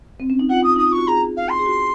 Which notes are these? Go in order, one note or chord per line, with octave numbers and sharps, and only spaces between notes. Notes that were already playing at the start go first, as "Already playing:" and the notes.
C4
C#4
D#4
F4 F#5
D#6
D#4 D#6
F4
C#6
F#4
G#4 A#5
F5
C6
G#4
F#4